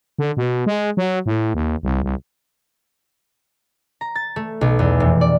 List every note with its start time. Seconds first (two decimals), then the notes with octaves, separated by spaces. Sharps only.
0.19 D3
0.37 B2
0.66 G#3
0.97 F#3
1.26 A2
1.54 D#2
1.83 C2
2.03 C2
4.01 A#5
4.15 A6
4.36 A3
4.61 B1
4.79 E2
5.00 F1
5.21 D5